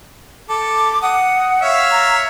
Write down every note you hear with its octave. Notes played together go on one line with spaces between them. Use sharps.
A4 D6
F#5 D#6
C#5 E5 F5
A#5